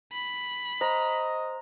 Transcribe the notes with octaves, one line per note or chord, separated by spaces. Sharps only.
B5
C5 D#5 A#5